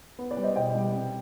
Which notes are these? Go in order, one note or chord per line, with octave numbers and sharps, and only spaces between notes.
B3
B4 D5
G3
C5 D#5
B2 D#5 G5
G3
C3